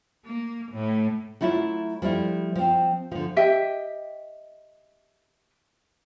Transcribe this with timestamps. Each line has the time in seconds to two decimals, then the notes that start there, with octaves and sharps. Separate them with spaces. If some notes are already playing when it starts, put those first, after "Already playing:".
0.25 A#3
0.72 A2
1.41 F#3 A3 E4 F4 E5
2.02 F3 G3 A3 E4
2.55 F3 C4
3.12 D3 F3
3.36 G4 D#5 E5 G5